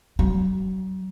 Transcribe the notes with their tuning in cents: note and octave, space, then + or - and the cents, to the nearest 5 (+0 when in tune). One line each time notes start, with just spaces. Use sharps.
F#3 +35